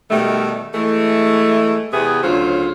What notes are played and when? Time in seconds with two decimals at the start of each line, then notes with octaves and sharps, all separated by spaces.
0.11 B2 D#3 G3 A3
0.74 E3 G#3 A3
1.93 E2 C3 B3 G#4
2.23 D2 C#3 F#3 F4 C5